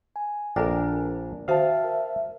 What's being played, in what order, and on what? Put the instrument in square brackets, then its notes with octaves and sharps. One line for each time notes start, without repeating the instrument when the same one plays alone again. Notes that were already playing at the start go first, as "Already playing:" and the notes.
[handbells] G#5
[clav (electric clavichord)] A#1 D4 A#4 [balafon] A4 G5
[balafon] D#3 F#4 C5 [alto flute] E5 [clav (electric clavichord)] F5 [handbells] G5 A5
[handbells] A#4